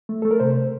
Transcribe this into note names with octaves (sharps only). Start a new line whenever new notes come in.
A3
A3 A4
A#4
C3 C5